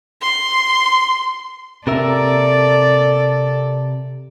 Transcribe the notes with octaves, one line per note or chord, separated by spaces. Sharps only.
C6
C3 A4 A#4 D5 E5